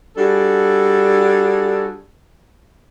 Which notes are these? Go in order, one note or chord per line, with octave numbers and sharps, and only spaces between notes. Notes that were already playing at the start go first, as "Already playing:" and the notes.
G3 D4 F#4 G#4 A4